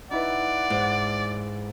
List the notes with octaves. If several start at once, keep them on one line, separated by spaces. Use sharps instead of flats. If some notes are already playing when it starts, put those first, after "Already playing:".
D#4 E4 B4 D5 F#5
G#2